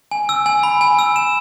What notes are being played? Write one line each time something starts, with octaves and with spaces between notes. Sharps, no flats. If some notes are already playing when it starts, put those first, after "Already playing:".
G#5
E6
G#5
B5
G#5
E6
E7